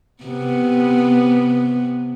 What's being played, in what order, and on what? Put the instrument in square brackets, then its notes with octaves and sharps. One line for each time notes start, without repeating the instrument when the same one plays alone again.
[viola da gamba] C3 B3